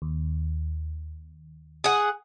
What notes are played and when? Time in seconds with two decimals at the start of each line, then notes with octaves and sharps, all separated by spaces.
0.02 D#2
1.84 G#4 F#5